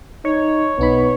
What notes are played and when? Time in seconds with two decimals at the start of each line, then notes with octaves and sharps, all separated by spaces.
0.25 D#4 C#5
0.79 B1 B3 D#4 B5